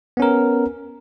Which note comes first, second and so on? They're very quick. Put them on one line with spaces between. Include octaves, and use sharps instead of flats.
B3 C#4 A#4